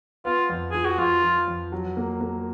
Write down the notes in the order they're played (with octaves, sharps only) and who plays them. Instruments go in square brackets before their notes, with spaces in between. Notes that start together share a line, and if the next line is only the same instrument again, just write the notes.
[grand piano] B3 [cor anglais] F4
[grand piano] F2
[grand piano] F3 [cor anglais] G#4
[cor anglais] F#4
[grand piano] F2 [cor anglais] F4
[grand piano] F3
F2
F#3
A#3
A#3